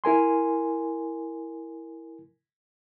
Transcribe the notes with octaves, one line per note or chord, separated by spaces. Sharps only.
E4 A#4 G#5 C6